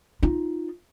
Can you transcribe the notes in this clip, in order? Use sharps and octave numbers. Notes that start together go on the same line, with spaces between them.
D#4 F4